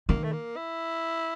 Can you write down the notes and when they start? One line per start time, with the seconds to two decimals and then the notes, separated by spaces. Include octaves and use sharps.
0.09 D#3 A#3
0.24 A3
0.32 A#3
0.56 E4